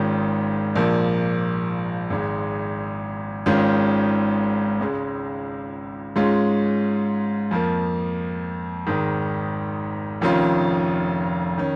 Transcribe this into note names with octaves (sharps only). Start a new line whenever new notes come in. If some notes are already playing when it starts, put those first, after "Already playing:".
Already playing: G#1 G#2 D#3 C#4 F4
A#1 A#2 F3 A#3
G#1 G#2 G#3
G#1 G#2 D#3 C#4 F4
C#2 C#3 G#3
G#2 G#3 C#4 F4
F2 F3 A#3
G#1 G#2 D#3
F1 F2 D#3 C#4 F4
D#3 C#4